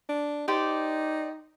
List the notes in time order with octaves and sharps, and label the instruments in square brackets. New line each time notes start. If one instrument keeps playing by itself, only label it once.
[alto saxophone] D4
[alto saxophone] D#4 [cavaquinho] G4 C5 D5